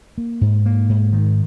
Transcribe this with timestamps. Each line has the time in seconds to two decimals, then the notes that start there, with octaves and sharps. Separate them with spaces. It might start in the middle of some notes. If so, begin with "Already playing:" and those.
0.18 A#3
0.41 G#2
0.66 A#3
0.89 G#2
1.13 D#3